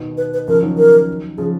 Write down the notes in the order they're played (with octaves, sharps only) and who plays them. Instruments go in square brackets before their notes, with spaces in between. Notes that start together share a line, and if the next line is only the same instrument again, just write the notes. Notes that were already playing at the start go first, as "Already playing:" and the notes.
Already playing: [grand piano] B2 D#3
[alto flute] B4
B4
[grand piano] C#3 F3 [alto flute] A#4
[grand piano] D#3 F#3
[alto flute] A#4
[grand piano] C#3 F3 [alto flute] G#4